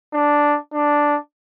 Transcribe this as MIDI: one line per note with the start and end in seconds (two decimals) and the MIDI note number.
0.14 0.58 62
0.73 1.17 62